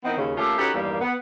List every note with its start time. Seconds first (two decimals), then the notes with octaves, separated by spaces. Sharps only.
0.04 E3 B3 C4 D#4 A#4
0.17 D#2 C#3
0.37 A3 A#3 C#4 F4 G4 A4
0.58 C#4 D#4 F#4 G4 A4 B4
0.74 E2 G2 D#3 G3 A#3
1.01 B3